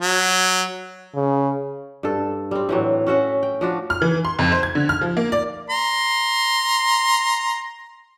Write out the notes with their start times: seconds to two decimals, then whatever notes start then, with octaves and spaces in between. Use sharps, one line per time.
0.02 F#3
1.14 C#3
2.03 G2 A4
2.51 G3 C4
2.69 A2 E3 F#3
3.07 C#4 F#4 E5 F#5
3.43 G5
3.61 F3 D4 F#4
3.90 F6
4.02 E3
4.25 C6
4.39 F2
4.52 C5
4.63 G#6
4.75 D3
4.89 F6
5.01 F3
5.17 A#3
5.32 D5
5.70 A#5 C6